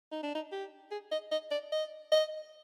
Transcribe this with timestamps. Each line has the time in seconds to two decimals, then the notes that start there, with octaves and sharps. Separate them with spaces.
0.12 D#4
0.23 D4
0.35 D#4
0.52 G4
0.91 G#4
1.11 D#5
1.31 D#5
1.51 D5
1.72 D#5
2.12 D#5